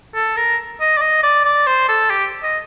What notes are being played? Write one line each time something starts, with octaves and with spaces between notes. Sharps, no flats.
A4
A#4
D#5
D5
D#5
D5
D5
C5
A4
G4
D#5